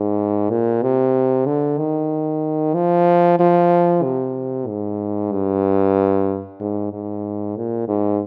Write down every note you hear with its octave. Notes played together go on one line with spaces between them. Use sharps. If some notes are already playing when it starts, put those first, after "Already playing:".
Already playing: G#2
A#2
C3
D3
D#3
F3
F3
C3
G#2
G2
G#2
G#2
A#2
G#2